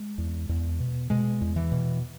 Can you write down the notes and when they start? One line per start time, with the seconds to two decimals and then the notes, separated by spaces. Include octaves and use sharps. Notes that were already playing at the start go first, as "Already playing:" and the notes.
Already playing: G#3
0.18 E2
0.49 E2
0.80 B2
1.10 B2 G#3
1.41 E2
1.56 E3
1.72 B2